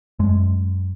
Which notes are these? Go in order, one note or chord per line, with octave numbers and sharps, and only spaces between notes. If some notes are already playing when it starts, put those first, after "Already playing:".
F#2 G#3